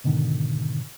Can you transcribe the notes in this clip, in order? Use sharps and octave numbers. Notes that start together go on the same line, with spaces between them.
G#2 B2 D3 D#3